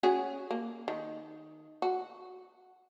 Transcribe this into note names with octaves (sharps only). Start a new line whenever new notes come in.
C#4 F#4 G#4
A#3
D#3
F#4